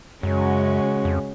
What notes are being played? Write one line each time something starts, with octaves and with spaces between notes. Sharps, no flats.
F#2 C#3 G#3 C#4 F#4
F2